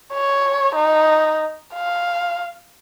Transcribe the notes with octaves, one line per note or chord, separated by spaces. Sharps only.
C#5
D#4
F5